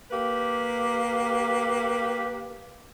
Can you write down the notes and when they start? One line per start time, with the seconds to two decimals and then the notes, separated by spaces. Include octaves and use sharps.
0.11 A#3 G4 B4